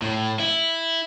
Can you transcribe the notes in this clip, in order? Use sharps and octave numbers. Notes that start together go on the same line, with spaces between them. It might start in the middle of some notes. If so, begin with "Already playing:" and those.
A2
E4